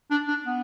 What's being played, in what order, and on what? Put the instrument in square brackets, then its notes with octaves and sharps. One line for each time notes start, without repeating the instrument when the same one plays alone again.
[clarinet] D4
D4
B3